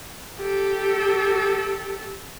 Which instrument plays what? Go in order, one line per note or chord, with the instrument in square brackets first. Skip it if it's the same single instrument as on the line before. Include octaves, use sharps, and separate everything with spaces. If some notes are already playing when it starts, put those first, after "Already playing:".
[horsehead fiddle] G4 A4